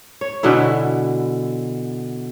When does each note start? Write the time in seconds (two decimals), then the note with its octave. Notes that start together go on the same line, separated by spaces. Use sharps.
0.21 C#5
0.43 B2 D3 E3 E4